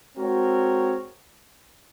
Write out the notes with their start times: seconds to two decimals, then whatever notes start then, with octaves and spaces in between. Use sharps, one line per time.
0.16 G#3 C4 F#4 A#4 C#5